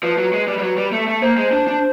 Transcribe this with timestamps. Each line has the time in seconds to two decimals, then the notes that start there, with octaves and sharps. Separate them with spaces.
0.03 F3 B4
0.18 F#3
0.33 G#3
0.47 G3
0.58 G3
0.63 F#3
0.77 G3
0.92 A3
1.07 A3
1.22 A#3 C5
1.37 G#3
1.53 D4
1.67 D4